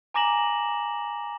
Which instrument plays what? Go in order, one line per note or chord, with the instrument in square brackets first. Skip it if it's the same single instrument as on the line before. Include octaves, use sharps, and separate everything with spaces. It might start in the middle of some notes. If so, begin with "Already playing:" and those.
[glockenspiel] G#5 A#5 D6 A#6 E7 F#7